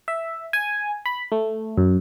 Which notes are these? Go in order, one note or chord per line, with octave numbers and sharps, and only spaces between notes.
E5
G#5
B5
A3
F#2